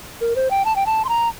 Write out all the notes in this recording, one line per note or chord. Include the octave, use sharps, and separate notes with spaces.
A#4
C5
G5
A5
G5
A5
C6
A#5